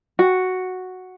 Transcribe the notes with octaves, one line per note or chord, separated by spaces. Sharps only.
F#4